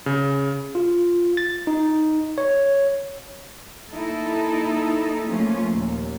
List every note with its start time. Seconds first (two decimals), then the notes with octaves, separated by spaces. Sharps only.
0.06 C#3
0.75 F4
1.37 A6
1.67 D#4
2.38 C#5
3.93 A#3 D#4 E4 A4
5.28 F3 A3 A#3 C#4 F4
5.73 D#2 A#2